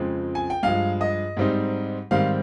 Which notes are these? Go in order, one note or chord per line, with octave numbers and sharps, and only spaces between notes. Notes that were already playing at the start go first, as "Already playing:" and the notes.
Already playing: F2 C#3 F3 G#3 C4
G#5
G5
G2 F3 G#3 F5
D#5
G#2 G3 C4 D#4
G#2 D#3 G3 C4 F5